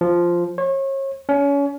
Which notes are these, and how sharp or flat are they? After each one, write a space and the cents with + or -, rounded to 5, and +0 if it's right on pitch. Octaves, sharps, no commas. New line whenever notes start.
F3 -5
C#5 -35
C#4 +30